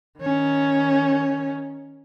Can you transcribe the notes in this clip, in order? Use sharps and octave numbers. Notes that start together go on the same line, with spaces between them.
D#3 C#4